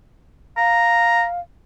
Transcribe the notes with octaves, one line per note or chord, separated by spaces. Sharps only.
F5 A#5